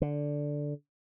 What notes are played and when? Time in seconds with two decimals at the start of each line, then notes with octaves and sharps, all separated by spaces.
0.02 D3